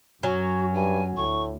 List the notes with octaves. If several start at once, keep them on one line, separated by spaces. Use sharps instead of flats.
F#2 F#3 C#4 F#4
G2 G#5
D2 A2 C#6